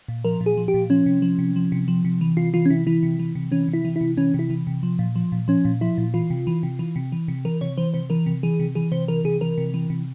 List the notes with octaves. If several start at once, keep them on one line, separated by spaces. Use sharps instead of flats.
A#2
F3 A#4
A#2
G#4
F3
G4
A#2
F3 C#4
C3
F3
C3
F3
C3
F3
C3
E3
C3 F4
E3 F4
C#4
C3 E4
E3 E4
C3
E3
C3
E3 C#4
C3
E4
E3
E4
C3
E3 C#4
C3 E4
E3
C3
F3
A#2
F3
A#2
F3 C#4
A#2
F3 E4
A#2
E3 F4
C3
E3
C3
E3
C3
E3
C3
E3 A#4
C3 C#5
E3 C5
C3 C5
E3 A#4
C3
E3 G#4
C3
E3 G#4
C3 C5
E3 A#4
C3 G#4
E3 A#4
C3
E3
C3